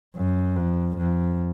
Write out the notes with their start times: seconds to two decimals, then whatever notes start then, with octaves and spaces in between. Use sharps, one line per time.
0.16 F#2
0.56 F2
0.97 F2